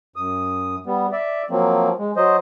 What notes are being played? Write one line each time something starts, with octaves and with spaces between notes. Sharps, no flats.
F#2 D#6
G3 B3
D5 E5
F3 F#3 A#3 C4
G#3
F#3 C5 D#5